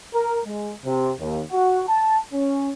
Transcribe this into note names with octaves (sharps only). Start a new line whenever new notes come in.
A#4
G#3
C3
D#2
F#4
A5
C#4